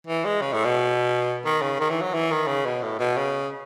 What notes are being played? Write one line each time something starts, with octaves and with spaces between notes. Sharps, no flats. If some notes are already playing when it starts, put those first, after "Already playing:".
E3
G#3
C#3
A2
B2
D#3
C#3
D#3
E3
F#3
E3
D#3
C#3
B2
A2
B2
C#3